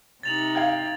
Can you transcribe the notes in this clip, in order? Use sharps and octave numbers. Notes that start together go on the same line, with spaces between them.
C3 D#4 A6 F7 F#7
F5 G5 G#6